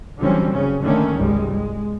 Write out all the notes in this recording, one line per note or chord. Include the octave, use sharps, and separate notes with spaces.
D3 E3 F#3 G3 C4 C#4
F#1 C#3 C#4
D3 D#3 A3 A#3 C#4
G1 C2 G3 G#3
G#3